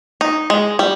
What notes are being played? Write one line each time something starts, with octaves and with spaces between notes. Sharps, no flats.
D#4
G#3
G3